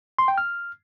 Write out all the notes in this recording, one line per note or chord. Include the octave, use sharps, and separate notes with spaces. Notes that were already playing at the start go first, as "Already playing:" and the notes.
C6
G5
F6